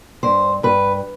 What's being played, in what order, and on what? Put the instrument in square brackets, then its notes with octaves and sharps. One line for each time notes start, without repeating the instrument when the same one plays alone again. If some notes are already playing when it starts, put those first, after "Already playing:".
[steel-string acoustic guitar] G2 C5
G2 B4